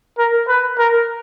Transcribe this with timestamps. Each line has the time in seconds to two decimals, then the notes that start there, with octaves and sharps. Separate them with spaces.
0.18 A#4
0.48 B4
0.78 A#4